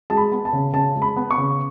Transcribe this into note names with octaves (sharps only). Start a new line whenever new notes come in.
G#3 A5
B5
B3
A5
C#3
C#3 A5
G#3
B5
B3
C#6
C#3